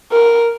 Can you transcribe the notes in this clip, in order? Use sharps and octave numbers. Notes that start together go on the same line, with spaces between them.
A#4